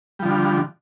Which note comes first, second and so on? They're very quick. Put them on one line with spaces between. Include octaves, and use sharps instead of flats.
G3 F3 D3